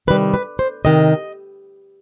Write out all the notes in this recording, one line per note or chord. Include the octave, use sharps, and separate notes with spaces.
C3 D#3 G3 B4
B4
C5
C3 D#3 D#5